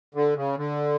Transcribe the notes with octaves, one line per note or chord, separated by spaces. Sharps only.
D3
C#3
D3